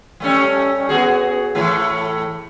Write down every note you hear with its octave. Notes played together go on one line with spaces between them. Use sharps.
G3 A3 C#4
B3 F#4 G#4
A2 E3 A3